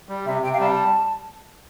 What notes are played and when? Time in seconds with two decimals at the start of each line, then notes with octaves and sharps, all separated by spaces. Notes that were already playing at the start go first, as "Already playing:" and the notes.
0.09 G3
0.25 C3 E5
0.42 C3 G5
0.51 F5
0.60 G3 A5